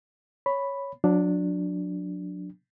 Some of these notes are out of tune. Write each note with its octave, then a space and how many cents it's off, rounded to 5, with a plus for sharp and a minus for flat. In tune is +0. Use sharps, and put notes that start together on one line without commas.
C#5 +0 B5 +0
F#3 -35 D4 +0